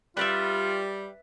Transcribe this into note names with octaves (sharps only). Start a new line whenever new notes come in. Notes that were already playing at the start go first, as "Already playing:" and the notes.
G3 F4 B4 D5 E5